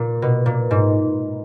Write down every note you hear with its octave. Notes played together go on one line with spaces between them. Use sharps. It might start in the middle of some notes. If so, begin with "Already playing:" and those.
Already playing: A#2
B2
A#2
G#2